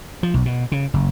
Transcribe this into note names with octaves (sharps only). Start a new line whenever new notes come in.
F3
B1
B2
C#3
F#1